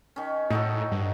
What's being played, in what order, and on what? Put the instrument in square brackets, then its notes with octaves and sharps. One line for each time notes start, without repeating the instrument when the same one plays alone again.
[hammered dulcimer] D#3 C#4
[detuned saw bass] A2 [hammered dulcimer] D#4 F#4 A4
[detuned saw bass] G2